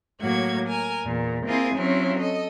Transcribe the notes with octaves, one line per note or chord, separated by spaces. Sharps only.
A2 F#3 A#3 F#4 G#6
A#4 G#5
E2 A#2
A#3 C4 E4 F4 G#4
F#3 C4 C#4 E4 F4
A4 D#5